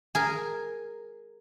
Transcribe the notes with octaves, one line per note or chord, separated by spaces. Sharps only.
G#4 A#4